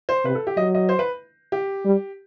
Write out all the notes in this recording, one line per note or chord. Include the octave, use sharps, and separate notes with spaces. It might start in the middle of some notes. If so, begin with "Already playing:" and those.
C5
C3 B4
A4
G4
F#3 D#5
D#5
C5
B4
G4
G3